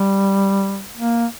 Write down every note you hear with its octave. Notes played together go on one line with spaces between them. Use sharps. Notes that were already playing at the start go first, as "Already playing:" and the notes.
Already playing: G3
A#3